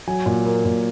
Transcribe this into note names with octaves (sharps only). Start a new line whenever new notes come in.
F#3 G#5
A#2
A#3
A#2